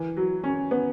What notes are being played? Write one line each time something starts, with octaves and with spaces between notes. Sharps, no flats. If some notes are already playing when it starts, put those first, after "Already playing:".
Already playing: E3
F#3
C#4
B3